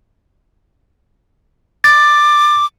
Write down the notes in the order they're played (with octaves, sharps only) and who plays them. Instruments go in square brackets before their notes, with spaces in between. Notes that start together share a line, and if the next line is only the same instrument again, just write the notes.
[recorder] D6 [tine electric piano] A6